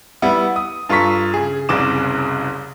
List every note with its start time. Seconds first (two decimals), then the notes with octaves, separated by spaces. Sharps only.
0.22 G3 B3 E4
0.56 D#6
0.89 G2 F4 A4 A#5 C#6 B6
1.34 C#3 G#4
1.69 F#1 C2 C#3 D6 E7